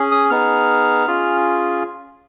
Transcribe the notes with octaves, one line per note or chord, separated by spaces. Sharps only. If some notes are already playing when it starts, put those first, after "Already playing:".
Already playing: C#4 G#4
D#6
B3 D#4 G#4 F6
C#4 F4 G#4